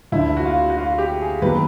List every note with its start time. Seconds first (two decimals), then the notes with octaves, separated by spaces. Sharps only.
0.12 D2 D3 F3 E4
0.37 F#4
0.45 F4
0.70 F#4
0.78 F4
0.98 G4
1.21 G#4
1.42 D#2 D#3 F#3 B3 B4